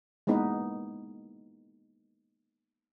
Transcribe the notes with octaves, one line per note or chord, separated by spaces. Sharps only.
G#3 A#3 B3 D#4 E4 B4